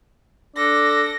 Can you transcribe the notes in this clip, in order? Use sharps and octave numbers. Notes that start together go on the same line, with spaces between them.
D4 A4 A#6